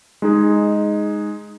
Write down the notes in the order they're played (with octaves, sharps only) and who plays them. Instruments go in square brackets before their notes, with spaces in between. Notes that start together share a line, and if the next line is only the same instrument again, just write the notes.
[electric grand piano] G#3 D#4 G#4